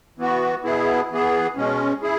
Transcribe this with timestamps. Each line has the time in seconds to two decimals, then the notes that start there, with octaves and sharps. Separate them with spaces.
0.18 E3 B3 F#4
0.64 B2 B3 E4 G#4
1.10 E3 B3 G#4
1.56 B2 G#3 C#4
2.02 E4 G#4